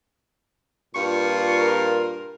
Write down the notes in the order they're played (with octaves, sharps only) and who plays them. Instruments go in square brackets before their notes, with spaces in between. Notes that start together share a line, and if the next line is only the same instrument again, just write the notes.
[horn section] G2 A#2 F4 [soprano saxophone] C#6
[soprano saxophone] A#4